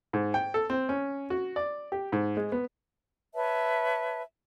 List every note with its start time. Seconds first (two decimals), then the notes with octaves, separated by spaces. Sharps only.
0.13 G#2
0.34 G5
0.54 A4
0.70 C4
0.89 C#4
1.30 F#4
1.56 D5
1.92 G4
2.12 G#2
2.37 G#3
2.52 B3
3.34 B4 C#5 E5 A5